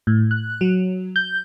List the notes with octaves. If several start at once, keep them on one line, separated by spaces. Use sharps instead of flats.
A2
F#6
F#3
G6